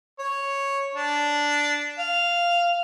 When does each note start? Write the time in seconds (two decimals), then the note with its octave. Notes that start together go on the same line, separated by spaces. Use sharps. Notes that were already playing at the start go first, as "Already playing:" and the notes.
0.19 C#5
0.95 D4
1.99 F5